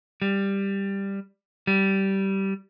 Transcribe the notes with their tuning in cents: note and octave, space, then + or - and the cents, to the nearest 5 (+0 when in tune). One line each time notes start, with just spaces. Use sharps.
G3 +10
G3 -15